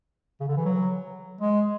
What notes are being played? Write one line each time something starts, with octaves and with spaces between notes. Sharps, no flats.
C#3
D3
E3
F#3
G#3